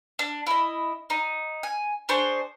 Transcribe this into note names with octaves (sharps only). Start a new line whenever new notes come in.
D4
E4 D#5
D#4
G#5
D4 G#4 C5 C#6